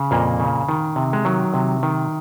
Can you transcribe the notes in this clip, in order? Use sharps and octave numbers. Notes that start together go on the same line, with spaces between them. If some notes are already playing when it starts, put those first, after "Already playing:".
Already playing: C#3
F2 A#2 A#3
C#3
D#3
C3
G#3
D#3 F#3
C3
D#3